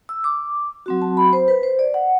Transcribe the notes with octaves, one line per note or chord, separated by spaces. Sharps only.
E6
D6
F#3 C4 F#4
A5
B5
C5
B4
C5
D5
F#5